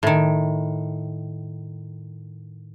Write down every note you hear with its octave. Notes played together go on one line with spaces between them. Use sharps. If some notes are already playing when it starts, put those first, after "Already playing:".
A2 D#3